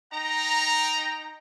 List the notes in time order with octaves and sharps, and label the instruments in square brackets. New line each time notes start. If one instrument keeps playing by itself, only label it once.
[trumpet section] D#4 G5 A#5